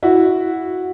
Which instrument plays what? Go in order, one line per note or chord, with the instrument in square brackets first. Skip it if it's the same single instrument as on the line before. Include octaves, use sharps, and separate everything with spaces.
[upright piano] E4 F#4